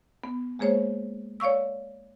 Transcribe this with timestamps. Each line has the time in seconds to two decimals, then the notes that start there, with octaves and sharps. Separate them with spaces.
0.24 B3
0.59 G#3 A#3 G#4 C5 C#5
1.40 C#5 D5 F5 C#6 E6